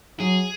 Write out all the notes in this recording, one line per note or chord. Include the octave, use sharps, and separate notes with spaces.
F#3 G#4